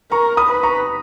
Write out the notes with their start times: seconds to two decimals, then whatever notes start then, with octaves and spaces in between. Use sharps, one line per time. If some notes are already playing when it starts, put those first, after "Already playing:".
0.12 A#4 A#5 C#6
0.37 B5 D#6
0.50 B4
0.63 A#5 C#6